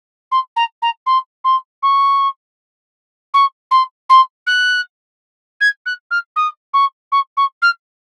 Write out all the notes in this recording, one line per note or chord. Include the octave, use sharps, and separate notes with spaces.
C6
A#5
A#5
C6
C6
C#6
C#6
C6
C6
F#6
G#6
F#6
F6
D#6
C#6
C#6
C#6
F6